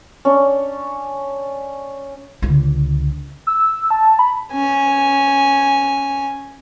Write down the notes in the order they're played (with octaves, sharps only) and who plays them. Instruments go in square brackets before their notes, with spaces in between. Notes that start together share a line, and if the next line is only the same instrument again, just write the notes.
[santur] C#4 D4
[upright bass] C#2 D3
[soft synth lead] E6
A5
B5
[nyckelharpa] C#4 G#5